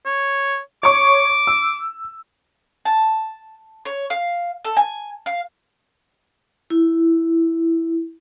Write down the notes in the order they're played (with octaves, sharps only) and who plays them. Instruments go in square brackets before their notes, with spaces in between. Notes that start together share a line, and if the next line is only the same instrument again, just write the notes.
[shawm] C#5
[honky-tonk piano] C#5 C#6 [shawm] D6
[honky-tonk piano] E6
[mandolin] A5
C#5
F5
A4
G#5
F5
[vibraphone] E4